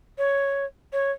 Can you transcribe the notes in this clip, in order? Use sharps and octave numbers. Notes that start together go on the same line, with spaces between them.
C#5
C#5